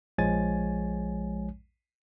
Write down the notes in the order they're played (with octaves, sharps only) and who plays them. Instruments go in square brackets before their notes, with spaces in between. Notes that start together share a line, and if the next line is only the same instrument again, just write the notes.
[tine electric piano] A#1 F3 G#3 C#5 G#5 A6